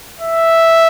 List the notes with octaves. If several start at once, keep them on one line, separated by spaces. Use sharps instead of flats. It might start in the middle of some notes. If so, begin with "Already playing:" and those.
E5